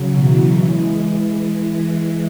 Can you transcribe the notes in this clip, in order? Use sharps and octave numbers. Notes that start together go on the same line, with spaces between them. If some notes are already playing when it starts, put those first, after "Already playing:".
Already playing: C#3 F#3
B2 E3
E3 G#3